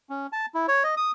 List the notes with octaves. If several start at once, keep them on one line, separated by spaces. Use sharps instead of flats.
C#4
A5
E4
C#5
D#5
D#6